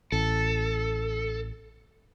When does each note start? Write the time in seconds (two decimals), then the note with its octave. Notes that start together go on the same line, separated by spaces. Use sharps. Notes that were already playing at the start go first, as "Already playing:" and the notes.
0.12 A1 A4